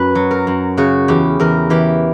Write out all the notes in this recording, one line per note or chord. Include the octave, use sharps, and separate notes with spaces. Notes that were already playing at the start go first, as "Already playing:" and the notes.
Already playing: F#2 B4
F#3
A#4
F#2
C#3 F#4
E2 G4
E2 A#4
E3 G4